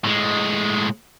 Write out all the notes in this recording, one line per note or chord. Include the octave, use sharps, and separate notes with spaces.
A2 G#3